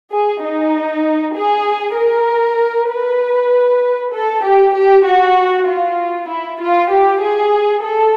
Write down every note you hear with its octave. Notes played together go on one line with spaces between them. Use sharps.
G#4
D#4
G#4
A#4
B4
A4
G4
G4
F#4
F4
E4
F4
G4
G#4
A4